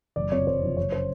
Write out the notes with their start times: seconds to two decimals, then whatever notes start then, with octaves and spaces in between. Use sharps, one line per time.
0.16 F#1 D5
0.32 F2 C3 F3 C#5
0.47 F#1 C5
0.62 F2 C3 F3
0.77 F#1 C#5
0.92 C#3 C5